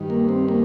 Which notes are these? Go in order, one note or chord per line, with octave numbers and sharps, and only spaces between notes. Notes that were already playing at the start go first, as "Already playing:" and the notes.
Already playing: G2 D#3
A#3
C4
A#3